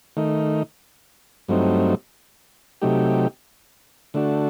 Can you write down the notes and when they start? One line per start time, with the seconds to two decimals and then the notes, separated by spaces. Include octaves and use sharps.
0.17 D#3 A3 D#4
1.48 G2 F#3 A3 C4 D#4
2.82 C3 F#3 A3 D#4 G4
4.14 D3 A3 D4 F#4